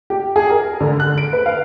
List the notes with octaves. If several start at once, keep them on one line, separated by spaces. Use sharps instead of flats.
G4
G#4
A#4
D3
F#6
D7
B4
F5